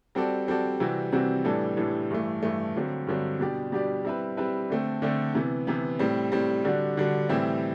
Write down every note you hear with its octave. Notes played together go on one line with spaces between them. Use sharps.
G3 C4 F#4 A4 D5
G3 C4 F#4 A4 D5
C3 E3 G3 C4 F#4
C3 E3 G3 C4 F#4
A2 E3 G3 D4 A4
A2 E3 G3 D4 A4
G2 E3 A3
G2 E3 A3
G2 D3 F#3 C4
G2 D3 F#3 C4
B2 G3 D4 G4 D5
B2 G3 D4 G4 D5
G3 C4 E4 B4
G3 C4 E4 B4
D3 A3 C4
D3 A3 C4
C3 E3 B3
C3 E3 B3
A2 G3 C4
A2 G3 C4
D3 G3 D4 F#4
D3 G3 D4 F#4
A2 E3 G3 C4 E4